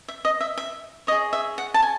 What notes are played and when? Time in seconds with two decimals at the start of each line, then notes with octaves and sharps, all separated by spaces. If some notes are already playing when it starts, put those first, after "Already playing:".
0.08 E5
0.25 D#5
0.41 E5
0.57 E5
1.07 C#5 D#5
1.12 G#4
1.33 E5
1.58 F#5
1.74 A5
1.82 G#5